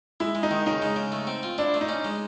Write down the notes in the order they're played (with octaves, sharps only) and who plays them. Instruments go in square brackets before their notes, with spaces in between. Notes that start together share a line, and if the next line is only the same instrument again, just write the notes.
[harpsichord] G#3 [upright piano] E4
[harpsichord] G#3
[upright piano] D#4
[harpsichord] D#3
[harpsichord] C#3 [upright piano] D#4
[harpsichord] G#3
C#3
A3
C4
F4
[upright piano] D4 [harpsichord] E4
[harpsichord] A3
[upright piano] D#4
[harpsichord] C#4
G#3